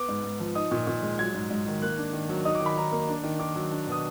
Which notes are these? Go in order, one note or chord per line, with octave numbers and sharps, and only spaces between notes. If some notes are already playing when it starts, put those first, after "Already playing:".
Already playing: B3 D6
G#2
G#2
F3
D#4 D#6
A#2
A#2
G#3
F#3 G#6
G#2
G#2
D#3
A#3 F#6
D4
D#3
F#3
D#4 D#6
D6
D#3
B5
D#3 A#5
A#3
D4
D#3
D#3 D6
F#3
D4
B2 D#6